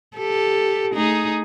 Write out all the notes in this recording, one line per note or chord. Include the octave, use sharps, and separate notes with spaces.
G4 A4
A3 D#4 G#4